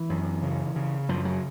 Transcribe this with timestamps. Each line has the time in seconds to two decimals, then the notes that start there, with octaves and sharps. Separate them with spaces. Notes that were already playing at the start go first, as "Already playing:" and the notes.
Already playing: E3
0.09 F#2
0.43 C#3
0.76 C#3
1.09 F#2 F3
1.25 F#3